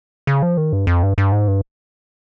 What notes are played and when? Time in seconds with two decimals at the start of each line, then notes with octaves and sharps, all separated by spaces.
0.27 C#3
0.42 F3
0.57 D#3
0.73 G2
0.87 F2
1.03 G2
1.18 G2
1.32 G#2
1.48 G2